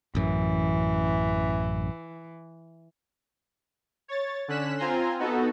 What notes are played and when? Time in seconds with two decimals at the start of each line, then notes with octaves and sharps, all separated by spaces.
0.15 A1 F#2 E3
4.08 C#5 A6
4.48 D3 C#4 F#6 B6 E7
4.78 C4 F4 G#5 A#5 C6
5.19 B3 D#4 F#4 A4